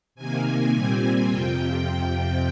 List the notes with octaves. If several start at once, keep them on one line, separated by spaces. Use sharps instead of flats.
C3 D#3 A#3 G#5
A#2 G3 C4
F2 C3 F3 G5